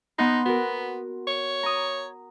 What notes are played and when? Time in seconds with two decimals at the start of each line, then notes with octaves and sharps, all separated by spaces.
0.18 B3 D#4 F#5 C6
0.45 B3 F#4 A#4
1.27 C#5
1.63 A#5 D#6